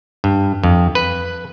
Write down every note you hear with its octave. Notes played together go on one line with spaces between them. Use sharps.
G2
F2
B4